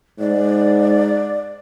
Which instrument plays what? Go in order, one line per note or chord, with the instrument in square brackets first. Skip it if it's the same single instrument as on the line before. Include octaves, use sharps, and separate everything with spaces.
[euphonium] G#2 [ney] D5